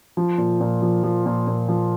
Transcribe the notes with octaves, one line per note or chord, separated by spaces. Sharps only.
F3
A#2
A#2
F3
F3
A#2
A#2
F3